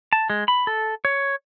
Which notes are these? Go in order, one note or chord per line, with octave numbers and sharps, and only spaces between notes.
A5
G#3
B5
A4
C#5